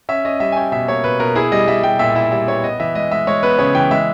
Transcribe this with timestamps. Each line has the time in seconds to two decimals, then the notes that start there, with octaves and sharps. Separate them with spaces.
0.09 C#4 E5
0.25 C#4 D#5
0.40 G3 E5
0.52 G#5
0.56 C#4 G5
0.72 B2 E5
0.88 A#3 C#5
1.04 B2 B4
1.20 B2 A#4
1.35 E4 G#4
1.52 G3 D#5
1.67 G3 E5
1.83 G3 G5
1.99 A#2 E5
2.15 E4 E5
2.31 G3 E5
2.47 B3 C#5
2.64 B3 D#5
2.80 E3 E5
2.95 G#3 D#5
3.11 G#3 E5
3.27 G#3 C#5
3.43 B3 B4
3.58 C#3 C#5
3.75 E3 G5
3.91 G#3 E5